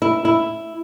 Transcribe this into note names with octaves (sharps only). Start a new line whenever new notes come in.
E4
E4